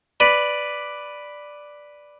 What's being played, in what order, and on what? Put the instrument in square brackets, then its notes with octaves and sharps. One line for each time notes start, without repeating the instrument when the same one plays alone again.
[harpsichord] B4 D5